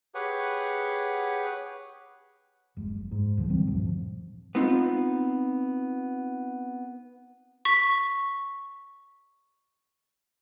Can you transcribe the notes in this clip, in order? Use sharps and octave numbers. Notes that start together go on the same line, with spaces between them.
G4 G#4 B4 C#5 F#5
F1 G#3
F#1
G#2
D2 D3 F3
E3 G3 C4
D2 G2 A#2 F3
B3 C4 D#4 F4
C#6 B6